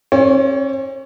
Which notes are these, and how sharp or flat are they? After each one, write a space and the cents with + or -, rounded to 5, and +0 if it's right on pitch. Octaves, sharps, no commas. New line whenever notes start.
C#4 -45 C#5 +30